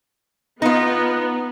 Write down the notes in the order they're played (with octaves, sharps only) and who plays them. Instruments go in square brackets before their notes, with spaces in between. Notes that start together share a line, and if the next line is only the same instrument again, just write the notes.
[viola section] B3 [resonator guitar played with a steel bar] D#4 F4